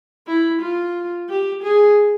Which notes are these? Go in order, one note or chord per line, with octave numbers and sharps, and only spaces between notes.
E4
F4
G4
G#4